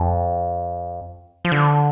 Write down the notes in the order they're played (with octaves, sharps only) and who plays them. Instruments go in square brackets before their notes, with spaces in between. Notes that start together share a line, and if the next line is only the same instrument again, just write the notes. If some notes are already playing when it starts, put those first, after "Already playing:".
Already playing: [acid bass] F2
F3
D3